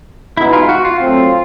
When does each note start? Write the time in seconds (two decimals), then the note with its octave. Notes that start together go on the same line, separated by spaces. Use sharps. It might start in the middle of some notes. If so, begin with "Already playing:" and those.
0.37 B2 G#3 B3 D#4 E4
0.53 F4
0.69 F#4
0.85 F4
1.00 F#3 A3 C4 F4